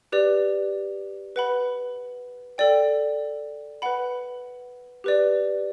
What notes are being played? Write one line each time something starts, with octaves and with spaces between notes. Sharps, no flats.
G4 B4 D5
B4 F#5 B5
A4 D5 G5
B4 F#5 B5
G4 B4 D5